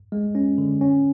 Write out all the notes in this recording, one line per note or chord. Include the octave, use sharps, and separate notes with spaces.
G#3
C#4
D3
C#4